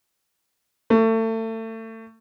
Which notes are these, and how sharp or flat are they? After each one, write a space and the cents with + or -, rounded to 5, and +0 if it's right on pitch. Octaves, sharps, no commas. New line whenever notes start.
A3 +30